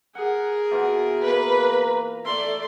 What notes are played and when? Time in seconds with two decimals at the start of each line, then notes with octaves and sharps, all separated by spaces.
0.15 G#4 A#4 F#5
0.71 B2 E3 F4
1.25 A#3 B4
1.71 A#5
2.25 A3 E4 D5 C6